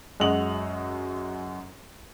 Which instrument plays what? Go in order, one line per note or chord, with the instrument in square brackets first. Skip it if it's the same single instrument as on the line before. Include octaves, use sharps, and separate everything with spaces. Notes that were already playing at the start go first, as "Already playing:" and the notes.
[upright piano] F#2 G#3 F#4 D#5 F7 F#7